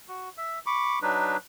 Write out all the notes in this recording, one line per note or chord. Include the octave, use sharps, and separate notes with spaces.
F#4
E5
B5 C#6 D6
F#3 D4 D#4 B4